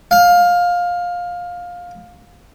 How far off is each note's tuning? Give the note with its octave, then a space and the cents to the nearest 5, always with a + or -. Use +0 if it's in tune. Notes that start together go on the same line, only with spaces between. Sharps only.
F5 +15